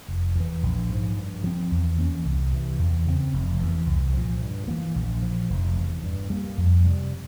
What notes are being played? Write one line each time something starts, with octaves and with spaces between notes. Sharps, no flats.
F1
E2 E3
A#1
G#2 F3
G2
F3 C4
E2
E3 A#3 C#4
C2
C3 E3
E2
C#3 F3 C4
F1
E2 E3
C2
A#2 F3
G2
E3 A#3
A#1
A#2 F3
F1
E2 C3
G2
G3 A#3
F2
C3 G3